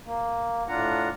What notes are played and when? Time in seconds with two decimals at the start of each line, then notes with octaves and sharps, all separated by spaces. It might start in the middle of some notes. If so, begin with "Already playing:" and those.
0.05 A#3
0.68 A2 D4 F4 F#5 A#5